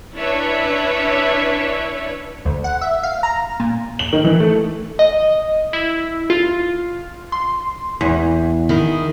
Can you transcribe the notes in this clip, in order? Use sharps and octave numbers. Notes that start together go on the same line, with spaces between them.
C#4 D4 E4 B4 C#5 E5
D2
F#5
E5
F5
A#5
A#2
F#7
D#3
E3
A3
D#5
E4
F4
C6
E2
D#3 E4 G#4